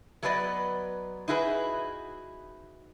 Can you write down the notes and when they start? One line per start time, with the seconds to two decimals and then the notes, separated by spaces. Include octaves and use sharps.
0.23 F#3 A3 B3 B4 D5 D#5
1.28 D#4 E4 F#4 G#4 A#4 B4